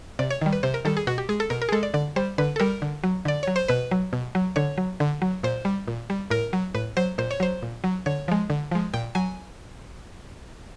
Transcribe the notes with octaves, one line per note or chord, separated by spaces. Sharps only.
C3 D5
C#5
D#3 G3
B4
C3 C5
A#4
D#3 G3 A4
G#4
B2 F#4
G4
G#3 G#4
A4
B2 A#4
A#4
G#4
G#3 A4
D5
D3 D5
G3 C5
D3 B4
A4
G3 A#4
D3
F#3
D3 D5
F#3 C#5
C5
B2 B4
F#3
B2
F#3
D3 C#5
F#3
D3
F#3
A#2 C5
G3
A#2
G3
A2 A#4
F#3
A2 B4
F#3 C5
A#2 C5
C#5
F#3 C5
A#2
F#3
D3 C#5
F3 G#3
D3
F3 G#3
A#2 G5
F#3 G#5